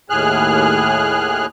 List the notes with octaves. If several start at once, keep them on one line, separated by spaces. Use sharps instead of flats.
D#2 A2 G#4 F6 F#6